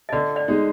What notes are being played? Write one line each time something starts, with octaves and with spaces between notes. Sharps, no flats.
D#5
D3 D5
D5
G#3 D#4